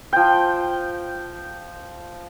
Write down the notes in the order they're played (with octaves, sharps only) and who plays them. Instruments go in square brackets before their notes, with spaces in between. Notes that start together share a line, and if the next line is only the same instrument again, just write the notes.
[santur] F3 G5